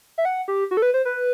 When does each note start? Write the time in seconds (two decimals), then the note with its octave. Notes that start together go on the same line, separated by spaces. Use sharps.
0.18 E5
0.25 F#5
0.48 G4
0.71 F#4
0.77 A4
0.82 B4
0.94 C5
1.05 B4